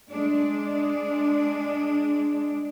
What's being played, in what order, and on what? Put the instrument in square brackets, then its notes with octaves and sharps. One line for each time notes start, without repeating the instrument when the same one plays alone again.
[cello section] G#3 D4